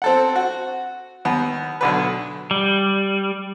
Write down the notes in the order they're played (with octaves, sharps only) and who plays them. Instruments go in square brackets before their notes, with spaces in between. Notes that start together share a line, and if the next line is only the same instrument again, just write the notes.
[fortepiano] C4 A4 F#5
F#4
D#2 B3
B1 D3 B4
[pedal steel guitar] G3